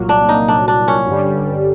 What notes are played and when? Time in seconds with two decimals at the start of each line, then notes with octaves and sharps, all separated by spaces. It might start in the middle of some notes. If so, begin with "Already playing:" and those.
Already playing: C2 A#2 F#3 A#3
0.09 D4
0.29 D#4
0.48 D4
0.68 D4
0.88 C#4
1.07 G2 D3 G3